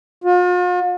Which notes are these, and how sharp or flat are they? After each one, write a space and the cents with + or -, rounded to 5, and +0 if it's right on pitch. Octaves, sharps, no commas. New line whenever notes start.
F4 +45